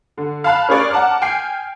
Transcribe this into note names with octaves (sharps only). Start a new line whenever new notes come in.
D3
F5 A5 B5 F6 F#6
C#4 G#4 A#4 C#5 D5
F#5 A5 A#5 D6 F6
G5 G#5 F6 C7